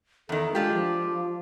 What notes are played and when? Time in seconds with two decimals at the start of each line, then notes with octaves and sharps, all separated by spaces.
0.29 E2 D#3 A4
0.55 G#3 D4 F4 G4
0.74 F3